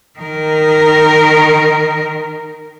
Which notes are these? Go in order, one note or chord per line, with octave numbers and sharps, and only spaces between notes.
D#3 A#4